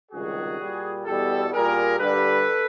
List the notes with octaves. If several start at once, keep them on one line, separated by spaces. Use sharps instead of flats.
C#2 C3 D#3 G3 F#4 G#4
A#2 G3
E2 B2 G3 G4 A4
A#2 G3 G#4 A#4
G2 D3 G3 A4 B4